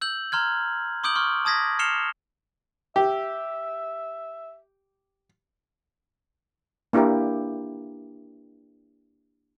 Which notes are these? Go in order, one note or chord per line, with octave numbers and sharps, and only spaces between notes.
E6 G6 F#7
A#5 C6 F6 G#6
C6 D6 D#6 G6 D7 F#7
C6 C#6 F6
A5 D#6 G#6 A#6 B6
F6 C7 C#7 E7 F7 G7
G4 E5
A#3 D4 E4 G4 A#4